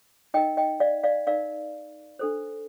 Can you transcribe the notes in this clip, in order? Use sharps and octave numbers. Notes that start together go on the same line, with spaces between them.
D#4 A#4 D#5 G5
D#5 G5
D5 F5
D5 F5
D#4 A#4 D5 F5
D4 A4 C5